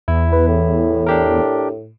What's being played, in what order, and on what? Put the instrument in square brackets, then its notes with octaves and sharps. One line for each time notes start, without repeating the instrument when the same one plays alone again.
[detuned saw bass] E2 [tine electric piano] E4
[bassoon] B4
A2
[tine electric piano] D4 G4 A#4